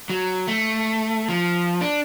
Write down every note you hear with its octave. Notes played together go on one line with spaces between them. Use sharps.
F#3
A3
F3
D4